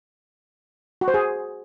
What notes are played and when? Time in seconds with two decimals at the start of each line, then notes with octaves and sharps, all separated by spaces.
1.01 F#4
1.08 C5
1.14 G#4